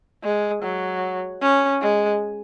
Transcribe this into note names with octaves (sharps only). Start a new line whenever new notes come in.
G#3
F#3
C#4
G#3